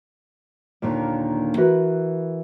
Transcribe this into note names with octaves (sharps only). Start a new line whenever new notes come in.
D#2 A#2 D3 D#3
E3 F#4 A#4 B4